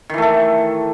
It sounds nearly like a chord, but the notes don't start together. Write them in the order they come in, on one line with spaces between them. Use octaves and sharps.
D#3 E3 A3 A4